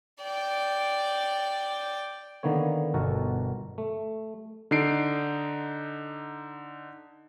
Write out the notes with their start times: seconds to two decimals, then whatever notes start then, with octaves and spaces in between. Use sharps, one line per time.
0.22 D5 G5
2.43 D3 D#3 A#3 B3 C#5
2.94 G1 B2 F#4 A4 A#4 F#5
3.78 A3
4.71 D3 D#4 C7 D7